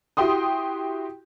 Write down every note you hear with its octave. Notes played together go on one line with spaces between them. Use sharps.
E4 F#4 G4 G5 C6 D#6